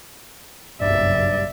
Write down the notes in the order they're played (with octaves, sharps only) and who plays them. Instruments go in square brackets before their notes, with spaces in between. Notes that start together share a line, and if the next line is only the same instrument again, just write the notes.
[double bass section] F#1 B1 [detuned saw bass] G2 [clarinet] D5 [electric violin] E5